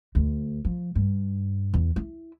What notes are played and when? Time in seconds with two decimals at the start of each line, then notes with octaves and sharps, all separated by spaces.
0.15 D2
0.65 F3
0.95 G2
1.74 E2
1.96 E4